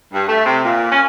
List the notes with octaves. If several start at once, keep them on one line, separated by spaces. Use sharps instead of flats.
G2
A3
C3
A#2
C#4